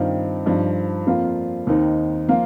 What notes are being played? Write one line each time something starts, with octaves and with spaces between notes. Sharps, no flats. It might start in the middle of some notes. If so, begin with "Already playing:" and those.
Already playing: G2 D#3 C4 F4
G2 F3 D#4
F2 F3 A#3 F4
D#2 D#3 C4 D#4
F3 A#3 F4